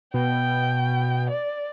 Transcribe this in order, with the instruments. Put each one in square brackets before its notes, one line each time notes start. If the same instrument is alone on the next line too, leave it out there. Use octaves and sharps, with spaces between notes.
[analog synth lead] B2 [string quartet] G5
[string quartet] D5